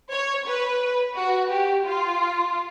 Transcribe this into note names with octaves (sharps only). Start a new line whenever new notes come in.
C#5
B4
F#4
G4
F4